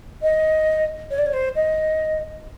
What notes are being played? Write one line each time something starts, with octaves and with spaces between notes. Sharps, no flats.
D#5
C#5
D5
C#5
C5
D#5